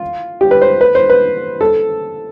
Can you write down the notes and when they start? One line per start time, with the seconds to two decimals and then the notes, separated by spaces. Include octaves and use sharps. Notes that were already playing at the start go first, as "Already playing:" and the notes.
Already playing: F4
0.41 G4
0.51 B4
0.62 C5
0.81 B4
0.95 C5
1.10 B4
1.61 A4